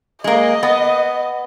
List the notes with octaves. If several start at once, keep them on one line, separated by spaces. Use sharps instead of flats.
G#3 A#3 D#5
B3